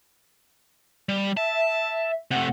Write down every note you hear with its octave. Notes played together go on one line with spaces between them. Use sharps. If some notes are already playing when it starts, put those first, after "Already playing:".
G3
E5 A5
C3 A3 F#5